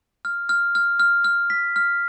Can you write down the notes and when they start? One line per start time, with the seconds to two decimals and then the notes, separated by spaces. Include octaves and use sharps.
0.25 F6
0.49 F6
0.75 F6
0.99 F6
1.24 F6
1.50 B6
1.76 F6